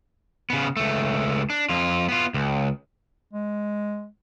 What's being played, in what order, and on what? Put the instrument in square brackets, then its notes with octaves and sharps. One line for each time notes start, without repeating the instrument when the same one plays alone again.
[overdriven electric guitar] C#3 B3
C#2 A3
D4
F2 F4
B3 F4
C#2
[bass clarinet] G#3